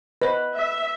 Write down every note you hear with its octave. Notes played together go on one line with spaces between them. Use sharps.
B4 C5 D#5
E5